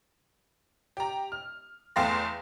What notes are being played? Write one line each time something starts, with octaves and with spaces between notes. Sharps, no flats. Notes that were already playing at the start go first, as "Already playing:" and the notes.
G4 A#5
F6
E2 A3 F5 G5 C6 A#6